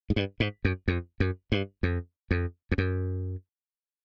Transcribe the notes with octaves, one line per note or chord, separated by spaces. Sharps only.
G#2
G2
G#2
F#2
F2
F#2
G2
F2
F2
F2
F#2